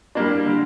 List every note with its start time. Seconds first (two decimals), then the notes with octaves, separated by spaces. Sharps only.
0.15 G3 A#3 D4
0.46 D3